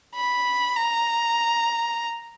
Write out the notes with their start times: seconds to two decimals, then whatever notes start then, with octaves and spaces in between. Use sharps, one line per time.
0.15 B5
0.76 A#5